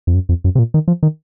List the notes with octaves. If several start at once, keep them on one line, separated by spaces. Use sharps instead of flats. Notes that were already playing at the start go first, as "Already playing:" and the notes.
F2
F#2
F2
F#2
C3
A#2
D#3
F3
D#3